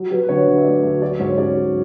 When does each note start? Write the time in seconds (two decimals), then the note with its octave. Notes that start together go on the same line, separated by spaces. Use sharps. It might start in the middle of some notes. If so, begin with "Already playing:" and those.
Already playing: F#3
0.11 F#3 B4
0.23 B4
0.29 D3 C#5
0.47 D3 B4
0.58 E5
0.65 A3 D5
0.83 D2 E5
1.01 F#3 D5
1.19 G#2 C#5
1.38 C#4 D5
1.56 F#3